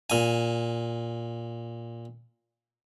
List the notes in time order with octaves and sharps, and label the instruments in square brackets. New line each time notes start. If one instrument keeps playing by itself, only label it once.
[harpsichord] A#2 G#5